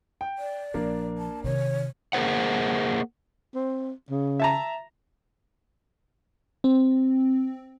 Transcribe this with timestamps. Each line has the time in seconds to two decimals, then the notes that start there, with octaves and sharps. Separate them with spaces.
0.21 G5
0.38 D5
0.74 A#1 F3 A#3 D4 A#4
1.18 A5
1.44 C3 D#3 C#5
2.13 A#3 G#4 A#4 C5 F#5
3.55 C4
4.10 C#3
4.40 E5 A5 A#5
6.64 C4